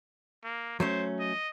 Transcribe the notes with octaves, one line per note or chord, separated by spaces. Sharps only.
A#3
F#3 A3 C#4 C5
D#5